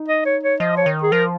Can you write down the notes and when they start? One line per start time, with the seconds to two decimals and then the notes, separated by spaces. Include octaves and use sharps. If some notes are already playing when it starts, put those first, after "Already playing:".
Already playing: D#4
0.08 D#5
0.25 C#5
0.43 C#5
0.60 F3 D#5
0.77 C#5
0.86 D#3
1.03 G#4
1.12 F3 A#4